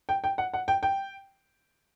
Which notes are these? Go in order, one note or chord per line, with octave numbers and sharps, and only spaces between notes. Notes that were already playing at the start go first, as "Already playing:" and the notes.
G5
G5
F#5
F#5
G5
G5